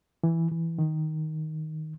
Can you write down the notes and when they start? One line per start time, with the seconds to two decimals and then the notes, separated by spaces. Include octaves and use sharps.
0.23 E3
0.51 E3
0.78 D#3